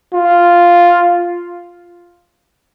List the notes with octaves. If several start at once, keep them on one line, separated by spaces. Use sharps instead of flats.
F4